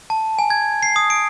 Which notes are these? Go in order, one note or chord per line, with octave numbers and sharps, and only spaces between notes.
A5
G#5
G#6
C7
D#6
D7